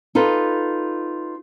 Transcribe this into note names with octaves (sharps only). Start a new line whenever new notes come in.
D#4 F4 A4 B4